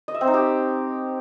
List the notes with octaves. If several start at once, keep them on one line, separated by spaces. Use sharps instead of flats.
D#5
E5
C4
D#4
G4